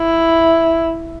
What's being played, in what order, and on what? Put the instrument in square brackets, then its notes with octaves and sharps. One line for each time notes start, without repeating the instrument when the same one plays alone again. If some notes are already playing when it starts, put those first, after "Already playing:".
Already playing: [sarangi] E4